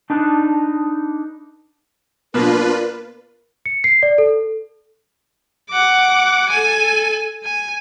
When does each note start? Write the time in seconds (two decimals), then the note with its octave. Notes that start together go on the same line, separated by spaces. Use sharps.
0.10 D4 D#4 B4 A5
2.34 B2 A#3 D4 F4 A#4 B4
3.66 C#7
3.84 C7
4.03 D5
4.18 A4
5.71 F#5 D6
6.49 A4 G#5
7.44 G#5